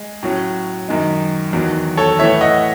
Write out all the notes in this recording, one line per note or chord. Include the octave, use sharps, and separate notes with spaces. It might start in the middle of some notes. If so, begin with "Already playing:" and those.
Already playing: G#3
A2 F#3 C#4
F#2 D#3 G#3
E2 D#3 F#3
A4 C#5
A2 E3 A3 C#5 E5
D#5 F#5